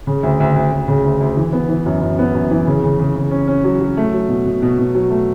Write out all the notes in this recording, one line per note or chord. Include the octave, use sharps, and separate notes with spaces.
C#3
D2
D2
D2
D2
C#3
D2
D2
E3
B3
E3
F#2
F#2
B3
F#2
E3
C#3
C#3
C#3
C#3
C#4
C#4
F#3
F#3
A3
F#3
B2
B2
B2
B2
F#3
A3